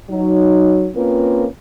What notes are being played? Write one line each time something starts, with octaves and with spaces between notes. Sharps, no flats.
F#3 D#4
A#3 C4 C#4 F4 A#4 B4